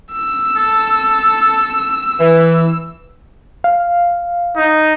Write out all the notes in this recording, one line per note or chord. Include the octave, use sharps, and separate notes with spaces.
E6
A4
E3
F5
D#4